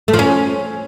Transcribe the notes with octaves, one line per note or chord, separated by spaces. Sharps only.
A3
F3
C#4